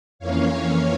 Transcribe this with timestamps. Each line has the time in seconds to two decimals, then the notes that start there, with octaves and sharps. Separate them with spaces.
0.19 F2 E3 A#3 C#4 C#5 F5
0.48 C#5 F5